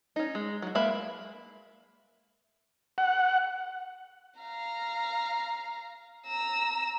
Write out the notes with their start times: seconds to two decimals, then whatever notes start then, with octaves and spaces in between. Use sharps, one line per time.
0.16 C#4 D#4
0.35 G#3
0.62 F#3 F#4
0.75 G#3 A#3 B4 E5 B5
2.98 F#5
4.40 F5 A#5
6.27 A#5 E6